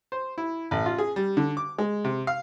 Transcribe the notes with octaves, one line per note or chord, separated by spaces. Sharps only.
C5
E4
A1
F4
G#4
G3
D3
D6
G#3
C3
F5